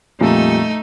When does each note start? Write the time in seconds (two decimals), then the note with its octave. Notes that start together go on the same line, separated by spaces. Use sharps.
0.21 F2 A#2 G3 A3 D#4